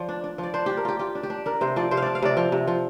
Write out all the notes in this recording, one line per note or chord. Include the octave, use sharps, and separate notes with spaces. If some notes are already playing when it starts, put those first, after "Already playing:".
Already playing: F3 D5
D4
D4
F3
D5
D4 C5
D4 G4
A#4
F4 G4
F4 G4
D4
G4
D4
D4 A#4
C3 C5
F3 D5
C3 C5
F5
D4 D5
F5
C3 D5
F3
C3
F3